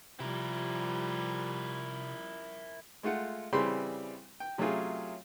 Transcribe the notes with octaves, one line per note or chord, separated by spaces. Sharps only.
C3 F3 G3 E4 A#4
G#3 A3 F4 F#5
C#3 E3 G3 C4 B5 C6
G5
C3 F#3 A3 C#4 F4 G#4